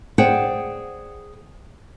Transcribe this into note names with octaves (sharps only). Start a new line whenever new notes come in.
G#4 C5 D5 F#5 G5